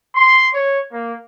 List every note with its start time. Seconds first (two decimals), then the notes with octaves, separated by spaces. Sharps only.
0.15 C6
0.54 C#5
0.92 A#3